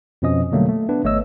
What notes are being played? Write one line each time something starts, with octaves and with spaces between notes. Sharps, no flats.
F2 B2 F3 C#4 D#5 D#6
B2 D3 F#3 G3 A3 A#3
A3
B3 D4 B4
G#1 A3 C#5 D#5 E6